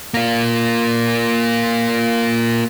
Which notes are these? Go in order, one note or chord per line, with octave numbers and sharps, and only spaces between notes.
A#3 F4